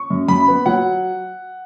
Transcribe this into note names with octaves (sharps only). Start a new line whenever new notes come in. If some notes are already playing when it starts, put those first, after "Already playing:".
Already playing: C#6
F#2
F#2 B5
B3
F#3 F#5